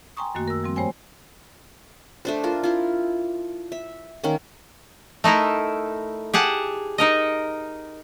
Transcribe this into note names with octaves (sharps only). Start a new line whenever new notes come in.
G5 G#5 A#5 C6 C#6 D#6
F#2 D#3 A3 A#3 F#4
A#4 E6
F3 G3 C4
G2 A3 C5 C#5 G5 G#5
A3 D4 C5
F4 A#4 C5
E4 F4
E5
D#3 A#3 C#4
A3 D#4 E4 A#4
G4 G#4 F#5 A5
D#4 A#4 D#5